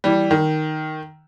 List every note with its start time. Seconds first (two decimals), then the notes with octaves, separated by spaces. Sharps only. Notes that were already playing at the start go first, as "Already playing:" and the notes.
0.04 E3 G3
0.31 D#3